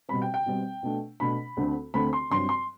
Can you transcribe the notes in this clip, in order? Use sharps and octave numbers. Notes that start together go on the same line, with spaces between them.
B2 G3 C4 B5
G5
G5
B2 G3 C4
B2 A3 D4
B2 A3 D4 B5
D2 D3 A3 C4
D2 D3 A3 C4 B5
C6
G2 F#3 C4 C6
C6